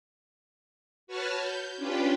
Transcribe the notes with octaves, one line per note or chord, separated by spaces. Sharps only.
F#4 B4 C#5 A5 F6
G6
C#4 D4 F4 G4 B4 G5